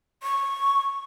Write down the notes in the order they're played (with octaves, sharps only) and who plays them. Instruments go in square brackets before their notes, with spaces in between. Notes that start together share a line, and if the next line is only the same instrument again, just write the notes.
[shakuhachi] C#6